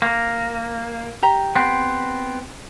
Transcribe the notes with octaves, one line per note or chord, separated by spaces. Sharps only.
A#3
G4 A#5
B3 C4